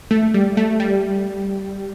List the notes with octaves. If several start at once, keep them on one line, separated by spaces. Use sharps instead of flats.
A3
G3
A3
G3